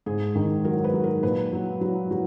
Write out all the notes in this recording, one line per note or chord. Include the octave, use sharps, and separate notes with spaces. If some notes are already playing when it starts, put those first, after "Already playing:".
G#2 G#4
D#3
F#3 A#4
B4
F#3
A#4
A#2 B4
F#3
F#3
F#3